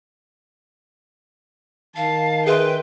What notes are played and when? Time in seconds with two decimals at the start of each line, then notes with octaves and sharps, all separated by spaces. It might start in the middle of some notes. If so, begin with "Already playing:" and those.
1.96 D#3 F5 A5
2.46 G#4 B4 E5 G5 C6